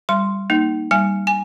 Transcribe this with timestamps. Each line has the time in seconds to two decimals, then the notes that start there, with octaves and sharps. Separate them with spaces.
0.09 G3 C6
0.50 A#3 D#4
0.91 G3 G#5
1.27 G#5